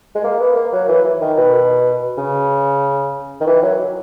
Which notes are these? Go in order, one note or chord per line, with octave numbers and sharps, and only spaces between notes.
G#3
A#3
B3
A#3
F#3
E3
E3
D#3
B2
C#3
D#3
E3
F#3